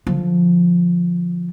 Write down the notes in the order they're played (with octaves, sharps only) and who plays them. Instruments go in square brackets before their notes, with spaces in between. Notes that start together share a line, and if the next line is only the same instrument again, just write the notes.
[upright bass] D3 F3